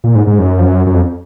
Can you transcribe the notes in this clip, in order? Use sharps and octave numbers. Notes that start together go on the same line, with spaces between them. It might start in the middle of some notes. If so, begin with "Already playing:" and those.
A#2
G#2
G#2
F#2
F2
F#2
F#2
F2